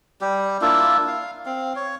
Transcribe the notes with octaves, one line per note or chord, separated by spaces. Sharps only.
G3 G4
A#3 D4 E4 F4
F5
C4 F5
C#5